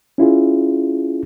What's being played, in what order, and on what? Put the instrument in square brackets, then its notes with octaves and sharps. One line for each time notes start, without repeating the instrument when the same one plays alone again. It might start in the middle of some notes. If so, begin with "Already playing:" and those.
[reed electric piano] C#4 E4 F4 G#4